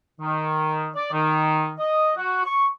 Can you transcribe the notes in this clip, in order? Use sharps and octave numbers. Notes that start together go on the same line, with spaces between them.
D#3
D5
D#3
D#5
F#4
C#6